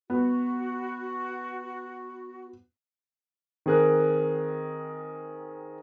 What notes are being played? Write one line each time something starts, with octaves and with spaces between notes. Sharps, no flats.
B3 F#4
D#3 C4 G#4 A#4 F#6